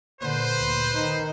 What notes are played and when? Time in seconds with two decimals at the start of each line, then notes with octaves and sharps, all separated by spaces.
0.21 A#2 D3 B4 C5
0.58 D2 A#2
0.93 D#3 D#4